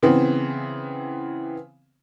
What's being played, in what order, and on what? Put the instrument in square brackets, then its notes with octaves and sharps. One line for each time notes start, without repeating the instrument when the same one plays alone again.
[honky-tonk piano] C#3 E3 B3 C4